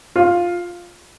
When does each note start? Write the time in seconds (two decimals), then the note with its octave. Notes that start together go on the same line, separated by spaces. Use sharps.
0.16 F4